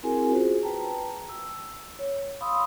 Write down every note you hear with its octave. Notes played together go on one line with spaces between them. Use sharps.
C4 E4 F#4 G#4 A#4 G#5
C#4 F4 F#4 G#4 C5
B4 G5 A5 A#5
E6
C#5
F5 B5 C6 D#6 E6